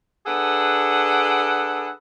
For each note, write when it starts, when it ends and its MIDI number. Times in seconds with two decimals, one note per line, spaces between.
0.26 1.89 62
0.26 1.89 68
0.26 1.89 69
0.26 1.89 71
0.26 1.89 78